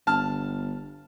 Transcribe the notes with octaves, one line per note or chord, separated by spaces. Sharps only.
G1 A5 F6